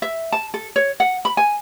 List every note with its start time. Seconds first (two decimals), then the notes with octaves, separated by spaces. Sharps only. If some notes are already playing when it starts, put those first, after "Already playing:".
0.02 E5
0.32 A5
0.54 A4
0.76 C#5
1.00 F#5
1.25 B5
1.37 G#5